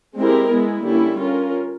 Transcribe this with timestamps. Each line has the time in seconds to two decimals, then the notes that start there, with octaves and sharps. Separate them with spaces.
0.18 G#3 C4 E4 G4 A#4
0.51 G#3 B3 E4 G#4
0.85 D3 G3 A#3 C#4 E4
1.19 C#4 F4 A#4